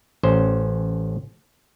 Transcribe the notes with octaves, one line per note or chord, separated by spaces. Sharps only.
A1 C#4 C5